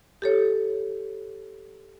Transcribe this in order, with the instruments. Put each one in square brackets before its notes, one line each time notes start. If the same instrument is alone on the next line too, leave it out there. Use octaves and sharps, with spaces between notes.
[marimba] G4 A4 C#5